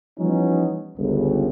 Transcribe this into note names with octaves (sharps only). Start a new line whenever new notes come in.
E3 F3 G3 B3 C#4 D#4
G1 C#2